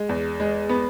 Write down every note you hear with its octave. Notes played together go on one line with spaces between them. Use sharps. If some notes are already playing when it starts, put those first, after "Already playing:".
Already playing: G#3
E2
G#3
B3